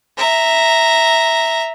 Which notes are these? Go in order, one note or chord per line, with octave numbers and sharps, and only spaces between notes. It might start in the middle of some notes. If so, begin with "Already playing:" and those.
E5 A#5